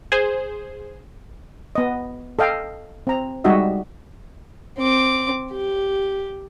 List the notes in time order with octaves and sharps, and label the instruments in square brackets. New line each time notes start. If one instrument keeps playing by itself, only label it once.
[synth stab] G#4 C5
[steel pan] B3 D#5
A4 D#5 F5 G5
C4 A#5
G3 G#3 D#4 F#4 D#5 E5
[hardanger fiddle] C4 D6
G4